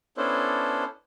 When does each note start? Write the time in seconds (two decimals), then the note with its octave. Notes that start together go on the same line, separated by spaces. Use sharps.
0.17 B3 C#4 D4 E4 A4 C5